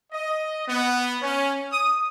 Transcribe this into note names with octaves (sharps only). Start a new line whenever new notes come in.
D#5
B3
C#4
D#6